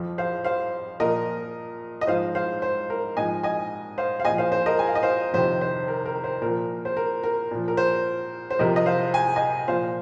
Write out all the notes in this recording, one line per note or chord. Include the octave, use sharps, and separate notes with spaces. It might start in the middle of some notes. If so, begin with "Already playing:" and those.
Already playing: F2 F3
C5 F5
C5 F5
A#2 F3 A#4 D#5
D#5
G#2 F3 C5 F5
C5 F5
C5
A#4
G#2 F3 D#5 G#5
D#5 G#5
C5 F5
F5
A#2 F3 D#5 G#5
C5 F5
C5
A#4 D#5
G#5
F5
D#5
C5 F5
F2 C3 D#3 C5
C5
A#4
A#4
C5
A#2 F3 A#4
C5
A#4
A#4
A#2 F3
A#4
C5
C5
F2 C3 F3 A#4 D#5
D#5
C5 F5
G#5
D#5 G#5
A#2 F3 C5 F5